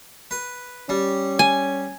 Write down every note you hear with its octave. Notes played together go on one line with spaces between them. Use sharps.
B4
G3 C#4
G#5